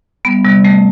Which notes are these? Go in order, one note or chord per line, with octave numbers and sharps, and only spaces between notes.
G3 B3
C3 G3
G3 A3